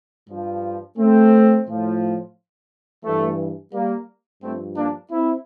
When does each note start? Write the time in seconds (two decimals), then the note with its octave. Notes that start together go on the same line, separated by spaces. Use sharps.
0.30 G2 F3
0.98 A3 C4
1.67 A2 F3
3.04 G2 E3 A3
3.73 G3 A#3
4.42 G2 F3 A3 C4
4.76 A#3 D4
5.11 C4 E4